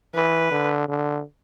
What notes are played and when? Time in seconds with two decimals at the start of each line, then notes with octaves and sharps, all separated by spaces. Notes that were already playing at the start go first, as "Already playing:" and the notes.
0.14 E3 B4
0.51 D3
0.88 D3